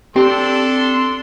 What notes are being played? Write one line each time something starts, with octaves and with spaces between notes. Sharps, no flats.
C4 D4 G4 A4 G5 C6